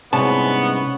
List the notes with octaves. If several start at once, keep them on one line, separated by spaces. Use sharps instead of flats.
C2 G#2 C3 B3 C#4 F#5 A5